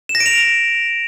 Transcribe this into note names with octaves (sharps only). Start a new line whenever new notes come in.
E7
A#6
D7
F7